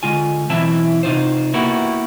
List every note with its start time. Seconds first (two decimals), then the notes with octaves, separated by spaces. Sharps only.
0.03 D3 G#3 F4 G#5
0.50 B1 E3 C4 E4 E5 A5
1.03 C3 D#4 F4 C5
1.54 A#3 B3 E4 F#4 G4 A#4